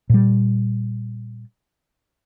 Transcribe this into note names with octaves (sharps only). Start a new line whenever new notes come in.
A#2 G3